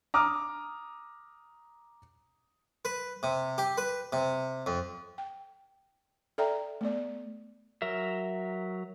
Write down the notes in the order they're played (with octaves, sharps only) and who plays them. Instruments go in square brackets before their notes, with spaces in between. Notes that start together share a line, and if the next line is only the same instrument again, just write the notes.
[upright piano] A#5 D6 D#6 F6
[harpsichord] B4
C3
G4
B4
C3
F2
[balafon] G5
A4 D5 E5 G5 A#5
A3 B3 D5
[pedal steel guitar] F#3 A#4 E5